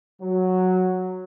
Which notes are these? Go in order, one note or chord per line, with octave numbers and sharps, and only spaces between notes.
F#3